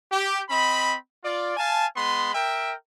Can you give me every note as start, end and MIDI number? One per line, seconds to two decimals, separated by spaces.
0.12 0.40 67
0.50 0.95 60
0.50 0.95 75
0.50 0.95 83
1.24 1.56 65
1.24 1.56 74
1.57 1.86 77
1.57 1.86 80
1.57 1.86 81
1.95 2.31 56
1.95 2.31 59
1.95 2.31 83
1.95 2.31 84
2.34 2.72 70
2.34 2.72 76
2.34 2.72 79